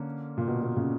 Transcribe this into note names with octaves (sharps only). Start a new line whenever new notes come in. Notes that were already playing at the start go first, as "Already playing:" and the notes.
Already playing: D3 A#3 C#4
A#2
B2
B2
A#2 C#3